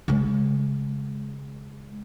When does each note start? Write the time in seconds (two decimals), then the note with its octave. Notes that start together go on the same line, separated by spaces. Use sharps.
0.08 C#3 G#3